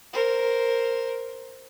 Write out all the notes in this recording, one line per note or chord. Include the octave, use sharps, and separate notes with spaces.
A#4 C5